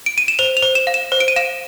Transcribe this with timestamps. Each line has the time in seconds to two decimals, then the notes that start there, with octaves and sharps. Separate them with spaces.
0.06 D7
0.18 D#7
0.28 E7
0.39 C5 F7
0.57 F7
0.62 C5
0.75 E7
0.87 F5
0.94 E7
1.12 C5
1.20 D7
1.28 D#7
1.36 F5 E7